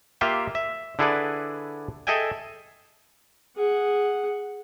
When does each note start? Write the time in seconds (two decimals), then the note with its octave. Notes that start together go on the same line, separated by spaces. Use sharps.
0.21 A#3 F4 G4 E5 F5 G5
0.55 E5
0.99 D3 E4 G#4 A4 B4 D5
2.07 G#4 A4 D#5 E5 G5 G#5
3.57 G#4 F#5